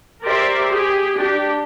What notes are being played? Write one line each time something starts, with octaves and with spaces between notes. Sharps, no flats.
G4 A#4 C5 D5 E5
G4 G#4
D4 G4